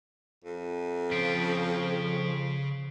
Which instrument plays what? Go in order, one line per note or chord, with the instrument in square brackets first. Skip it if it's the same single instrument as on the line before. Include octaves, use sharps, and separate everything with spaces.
[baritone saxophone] F2
[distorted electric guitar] C#3 [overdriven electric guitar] F3 [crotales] B6 C7 D7